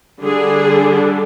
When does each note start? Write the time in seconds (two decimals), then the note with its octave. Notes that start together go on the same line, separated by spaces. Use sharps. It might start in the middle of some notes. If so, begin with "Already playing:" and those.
0.22 D3 G3 D4 G#4